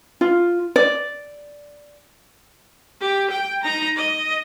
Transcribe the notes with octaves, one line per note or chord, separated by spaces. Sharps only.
F4
D5
G4
G5
D#4 A#5
D#5